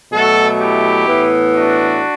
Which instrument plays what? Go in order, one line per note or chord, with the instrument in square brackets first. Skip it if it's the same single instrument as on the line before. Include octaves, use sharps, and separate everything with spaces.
[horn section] B2 F#3 A3 F#4 A4
E4 G4
A2 E3 B3
D4 F#4